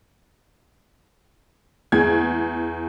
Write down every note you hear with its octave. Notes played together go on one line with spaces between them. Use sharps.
E2 G#4 G#6